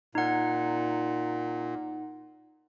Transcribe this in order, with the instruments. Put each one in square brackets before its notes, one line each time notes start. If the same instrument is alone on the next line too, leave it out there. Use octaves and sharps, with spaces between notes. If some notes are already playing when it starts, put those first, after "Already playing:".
[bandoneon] A#2 [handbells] D#4 F#5